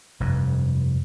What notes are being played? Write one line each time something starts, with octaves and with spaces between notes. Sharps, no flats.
F1 G2